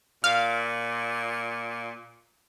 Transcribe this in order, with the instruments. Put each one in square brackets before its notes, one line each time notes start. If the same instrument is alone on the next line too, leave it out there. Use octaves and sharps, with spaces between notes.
[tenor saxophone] A#2 [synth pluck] F5